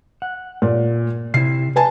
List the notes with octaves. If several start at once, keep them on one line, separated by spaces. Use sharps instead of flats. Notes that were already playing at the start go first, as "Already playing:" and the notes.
F#5
A#2
C3 E4 C7
B4 G#5 A5